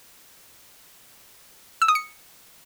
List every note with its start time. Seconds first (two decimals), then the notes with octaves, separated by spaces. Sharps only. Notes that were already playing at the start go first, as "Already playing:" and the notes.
1.82 E6
1.88 D#6
1.95 C#7